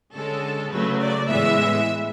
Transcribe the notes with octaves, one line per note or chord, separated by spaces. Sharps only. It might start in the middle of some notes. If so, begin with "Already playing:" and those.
D3 G#3 C#4 A4
C#3 F#3 A3 B4
D5
A2 E3 G#3 B3 E5